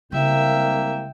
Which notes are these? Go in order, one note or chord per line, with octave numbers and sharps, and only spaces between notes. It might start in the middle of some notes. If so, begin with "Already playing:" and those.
C2 C#3 G#3 A#3 E5 G5